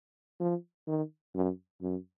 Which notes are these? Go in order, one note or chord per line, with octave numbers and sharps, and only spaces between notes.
F3
D#3
F#2
F#2